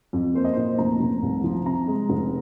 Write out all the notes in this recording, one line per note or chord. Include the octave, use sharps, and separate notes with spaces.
F2
A#3 C5
D#5
A#2 C5
F1 A#5
F1
C2
F3
C3 A#5
G#3
F1